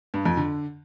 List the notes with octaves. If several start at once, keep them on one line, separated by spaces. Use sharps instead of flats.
G2
F2
D3